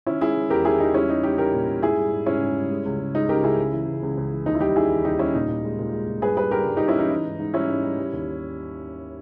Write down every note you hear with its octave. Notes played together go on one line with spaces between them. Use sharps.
D#3 C#4 E4
G#3 E4 G#4
G#3
E2 G4 A#4
D#3 E4 G#4
E2 D#4 G4
G3 C#4 E4
G3 D#4
G3 D#4 G4
G3 G4 A#4
A#2
A#2
G#2 E4 G#4
G3
G#2
G#2 C#4 E4
G#2
G3
G#3
C#2
C#2
G#3 D#4
C#2 G4 A#4
C#2 E4 G#4
C#3
E3
C#2
C#2
C#2
E3
D#2 D#4
E4
G3 D#4 G4
D#3 E4 G#4
D#2
D#2 D#4 G4
G3 C#4 E4
A#2 D#4
A#2
G#3
A#2
G#3
A#2
G2 G#4 B4
G3 G#4 B4
G2 G4 A#4
G2
G2 D#4 G4
C#4 E4
E3 D#4
E3
G#2
G#2
G3 C#4 E4
G#2
G3
G3
D#2